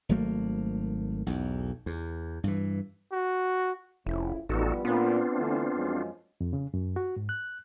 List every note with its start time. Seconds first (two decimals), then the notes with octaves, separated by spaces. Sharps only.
0.09 G#1 F#3 A3 A#3
1.26 B1 E2
1.86 E2
2.44 G2 E3
3.12 F#4
4.06 F1 F2 C#3 E4
4.49 A1 F3 G3 B3 D#4 F#4 A4
4.85 A#2 B3 C4 D4 F4
5.37 D3 E3 A3
5.75 F#2 F3 G#3
6.41 F2
6.53 C#3
6.74 F#2
6.96 F#4
7.16 G#2
7.29 F#6